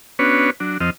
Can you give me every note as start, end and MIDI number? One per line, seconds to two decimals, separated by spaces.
0.19 0.50 59
0.19 0.50 61
0.19 0.50 62
0.19 0.50 66
0.19 0.50 71
0.19 0.50 73
0.60 0.78 54
0.60 0.78 62
0.81 0.90 41
0.81 0.90 53
0.81 0.90 60
0.81 0.90 75
0.81 0.90 89